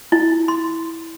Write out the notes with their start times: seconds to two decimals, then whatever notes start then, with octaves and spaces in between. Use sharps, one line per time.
0.12 E4
0.48 C6